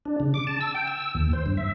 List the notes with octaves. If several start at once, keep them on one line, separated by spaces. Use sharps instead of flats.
D4
C#3
D6
A5
E6
G5
E6
E6
D#2
C5
G2
E5